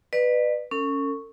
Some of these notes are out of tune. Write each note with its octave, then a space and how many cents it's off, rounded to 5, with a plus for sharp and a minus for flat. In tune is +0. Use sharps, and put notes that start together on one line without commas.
B4 +0 D5 +45
C#4 +0 A4 +45